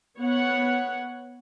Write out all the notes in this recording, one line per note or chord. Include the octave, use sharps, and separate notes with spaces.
B3 C#5 F#5